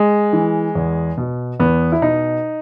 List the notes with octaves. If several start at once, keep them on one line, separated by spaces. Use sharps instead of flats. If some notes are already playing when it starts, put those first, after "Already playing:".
Already playing: G#3
E3
E2
B2
E2 B3
E4
B2 D#4